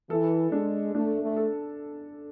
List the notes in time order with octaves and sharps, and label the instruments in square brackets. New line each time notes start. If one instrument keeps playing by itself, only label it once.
[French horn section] E3 [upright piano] A4
[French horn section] G#3 [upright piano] D4
[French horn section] A3 [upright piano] D4
[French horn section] A3
[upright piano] A4